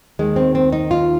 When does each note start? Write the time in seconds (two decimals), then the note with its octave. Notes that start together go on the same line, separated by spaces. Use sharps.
0.19 D#2 D#3 G#3
0.36 C4
0.55 C4
0.73 D#4
0.91 F4